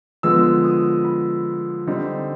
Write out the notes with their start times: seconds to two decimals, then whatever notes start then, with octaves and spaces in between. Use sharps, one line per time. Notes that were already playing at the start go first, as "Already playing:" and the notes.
0.23 D3 F3 G#3 B3 E6
0.64 D#6
1.05 B5
1.87 D3 G3 C4 D#4